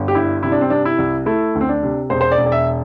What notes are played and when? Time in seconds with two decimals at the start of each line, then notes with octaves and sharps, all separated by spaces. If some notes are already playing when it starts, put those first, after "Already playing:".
Already playing: G1
0.08 G4
0.15 G2 E4
0.43 C3 E4
0.52 D4
0.61 C4
0.70 C3 D4
0.85 E4
0.98 C2
1.26 A3 E4
1.55 D2
1.61 C4
1.69 D4
1.83 C3
2.10 E1 C5
2.21 C5
2.32 D5
2.38 E1
2.46 D5
2.52 E5